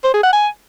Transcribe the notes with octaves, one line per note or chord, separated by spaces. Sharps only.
C5
G#4
F#5
G#5